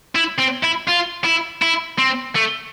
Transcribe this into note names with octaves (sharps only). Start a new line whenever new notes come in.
E4
C4
E4
F4
E4
E4
C4
A3